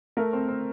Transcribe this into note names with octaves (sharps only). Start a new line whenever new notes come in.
A3 A#4
C4
C4